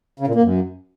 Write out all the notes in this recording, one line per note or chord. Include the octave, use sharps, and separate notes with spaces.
C#3
A#2
A#3
F#2